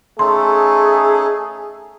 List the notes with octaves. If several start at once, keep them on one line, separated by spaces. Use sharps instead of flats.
A3 C#4 D#4 G#4 A4 C6